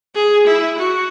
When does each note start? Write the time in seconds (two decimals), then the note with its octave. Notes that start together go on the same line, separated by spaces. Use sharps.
0.15 G#4
0.46 E4
0.78 F#4